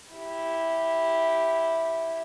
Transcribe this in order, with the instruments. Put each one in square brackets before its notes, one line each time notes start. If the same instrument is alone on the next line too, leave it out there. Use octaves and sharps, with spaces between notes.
[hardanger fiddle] E4 G4